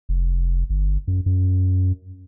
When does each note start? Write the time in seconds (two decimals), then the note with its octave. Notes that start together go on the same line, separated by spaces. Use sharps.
0.09 F1
0.70 G1
1.07 F#2
1.26 F#2